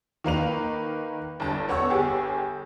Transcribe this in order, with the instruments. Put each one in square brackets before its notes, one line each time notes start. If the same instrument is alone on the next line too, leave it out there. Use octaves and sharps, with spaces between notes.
[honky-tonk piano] D#3 A#3 B4 F7
G1 G2 A5
B3 C#5 F#5 C#6 E6
G1 G4 G#4